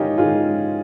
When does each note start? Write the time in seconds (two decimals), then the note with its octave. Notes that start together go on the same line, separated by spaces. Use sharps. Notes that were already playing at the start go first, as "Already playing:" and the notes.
Already playing: G#2 D#3 C#4 D#4 F4 G4
0.18 G#2 D#3 F4 G#4